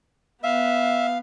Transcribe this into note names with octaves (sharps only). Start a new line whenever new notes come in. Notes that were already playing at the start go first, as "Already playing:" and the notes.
B3 E5 F5